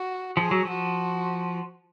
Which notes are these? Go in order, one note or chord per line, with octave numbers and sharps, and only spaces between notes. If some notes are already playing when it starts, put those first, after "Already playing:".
Already playing: F#4
F3 G#4
F#3
F3 F#4